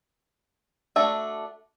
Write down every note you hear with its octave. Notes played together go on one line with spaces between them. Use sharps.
A3 D4 F#4 E5